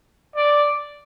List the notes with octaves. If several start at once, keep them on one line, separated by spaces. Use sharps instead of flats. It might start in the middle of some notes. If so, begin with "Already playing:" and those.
D5